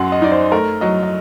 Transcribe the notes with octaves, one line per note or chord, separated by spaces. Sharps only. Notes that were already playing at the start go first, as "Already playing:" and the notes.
Already playing: F#2 F#3 F#5 C6
D#5
D#4 D5
C5
A3 A#4
F#3 D#5
D#5